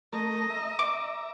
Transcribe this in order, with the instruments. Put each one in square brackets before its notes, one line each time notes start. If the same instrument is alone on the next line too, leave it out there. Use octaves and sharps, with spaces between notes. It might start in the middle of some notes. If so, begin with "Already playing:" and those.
[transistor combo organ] A3 A#4 [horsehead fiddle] D#5
[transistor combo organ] E5 A#5
[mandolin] D6